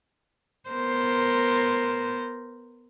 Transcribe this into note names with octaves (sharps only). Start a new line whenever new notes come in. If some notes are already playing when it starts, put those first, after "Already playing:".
B3 A#4 C5